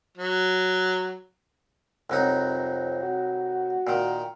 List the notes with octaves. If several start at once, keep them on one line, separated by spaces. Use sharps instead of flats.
F#3
C2 F2 F#3 D#4
F#4
A#2 D#3